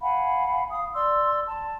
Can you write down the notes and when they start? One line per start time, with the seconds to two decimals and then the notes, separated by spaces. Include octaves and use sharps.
0.01 F5 F#5 G#5 B5
0.70 F5 D#6
0.93 D5 C6 E6
1.46 A5